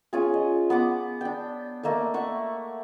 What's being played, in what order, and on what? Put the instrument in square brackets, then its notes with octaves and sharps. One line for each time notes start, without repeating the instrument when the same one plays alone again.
[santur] C#4 F4 G#4
D#5
B3 F#5 D6
D4 G5
A3 A#3 D5 D#5
E5 F#5 C#6